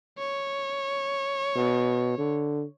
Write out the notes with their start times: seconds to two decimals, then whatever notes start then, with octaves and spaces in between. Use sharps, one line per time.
0.18 C#5
1.56 B2
2.18 D3